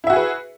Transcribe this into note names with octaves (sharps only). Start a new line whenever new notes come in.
E4 F#4 G#4 B4 E5